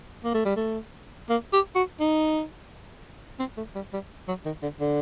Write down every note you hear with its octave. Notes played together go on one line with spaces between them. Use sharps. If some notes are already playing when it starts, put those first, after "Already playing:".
A#3
A3
G3
A3
A#3
G4
F#4
D#4
C4
A3
G3
G3
F#3
D#3
D3
D3